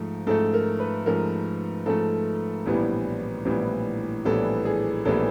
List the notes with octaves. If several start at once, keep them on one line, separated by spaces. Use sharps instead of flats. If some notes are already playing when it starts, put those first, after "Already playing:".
Already playing: G#2 F3 A3
G#2 F3 A3 A4
A#4
B4
G#2 F3 A3 A#4
G#2 F3 A3 A4
A#1 A2 E3 G3 B3
A#1 A2 E3 G3 B3
A#1 A2 E3 G3 B3 A4
G#4
A#1 A2 E3 G3 B3 A4